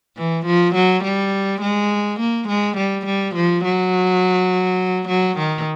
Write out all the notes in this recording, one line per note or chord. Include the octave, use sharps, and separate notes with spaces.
E3
F3
F#3
G3
G#3
A#3
G#3
G3
G3
F3
F#3
F#3
D#3